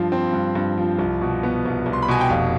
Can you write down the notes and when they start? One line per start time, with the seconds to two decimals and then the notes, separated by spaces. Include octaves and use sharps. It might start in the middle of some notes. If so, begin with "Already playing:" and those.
Already playing: G2 F3 F5
0.12 C4
0.33 G2
0.55 G2
0.77 F3
0.99 C2
1.22 B2
1.43 B3
1.65 C2
1.86 C2
1.93 C6
2.02 B5
2.08 B2 G#5
2.21 G5
2.30 F1 F5